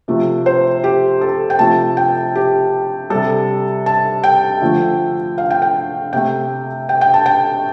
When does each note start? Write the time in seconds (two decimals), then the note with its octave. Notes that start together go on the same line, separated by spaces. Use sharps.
0.08 C3 F3 A3
0.46 C5
0.84 G4
1.21 A4
1.50 G5
1.59 C3 F3 A3 A5
1.97 G5
2.35 G4
3.10 C3 G3 A4
3.86 A5
4.24 G5
4.62 D3 F3 A3
5.38 F5
5.50 G5
5.62 G5
6.13 C3 A3 G5
6.89 G5
7.01 G5
7.14 A5
7.26 G5